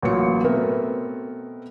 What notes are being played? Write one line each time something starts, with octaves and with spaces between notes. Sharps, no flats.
A1 A#2 F#3 C#7
B2 A3 B3 C4 A#4